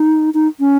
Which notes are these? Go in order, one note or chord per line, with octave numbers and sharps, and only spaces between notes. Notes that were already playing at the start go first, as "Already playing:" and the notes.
Already playing: D#4
D#4
C#4